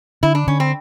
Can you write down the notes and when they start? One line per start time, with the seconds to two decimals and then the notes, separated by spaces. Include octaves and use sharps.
0.23 D3 E4
0.35 D4
0.47 D3 C#4
0.60 C4